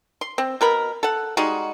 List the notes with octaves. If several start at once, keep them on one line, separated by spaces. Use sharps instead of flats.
C6
C4
B2 A#4 B5
A4 F#5
G3 G#3 D#4 F#4